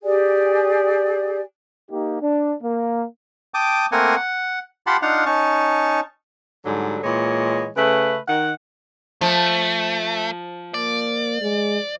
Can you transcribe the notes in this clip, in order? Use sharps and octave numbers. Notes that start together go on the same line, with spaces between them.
G4 G#4 D5 G#5
A#3 D#4 G4
D4
A#3
G5 A5 D6 D#6
A3 A#3 C4 A#4 F#5 G#5
F#5
F4 G4 F#5 A5 B5 C6
D4 D#4 F4 F5 F#5
C#4 D#4 A5 C#6
G#2 D3 F#3 G3
A#2 E3 G#3 C#5
C#3 A3 B4
D#3 F#5
F3 A3
A#3 D5
G#3